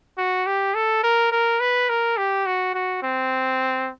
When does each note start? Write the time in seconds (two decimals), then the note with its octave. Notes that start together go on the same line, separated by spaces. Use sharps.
0.18 F#4
0.46 G4
0.75 A4
1.04 A#4
1.32 A#4
1.60 B4
1.89 A#4
2.17 G4
2.46 F#4
2.74 F#4
3.03 C4